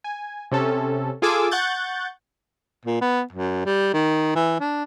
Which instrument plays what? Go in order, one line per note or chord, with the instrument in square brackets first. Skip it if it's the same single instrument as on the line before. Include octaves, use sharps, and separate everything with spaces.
[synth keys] G#5
C3 C#4 A4
F4 G#4 A4 G#5 D6 E6
F#5 C#6 F#6 G6 A6
[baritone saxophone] A#2
B3
F#2
G3
D#3
E3
D4